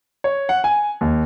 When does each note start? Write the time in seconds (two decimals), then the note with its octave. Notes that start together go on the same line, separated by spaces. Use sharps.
0.24 C#5
0.49 F#5
0.64 G#5
1.01 D#2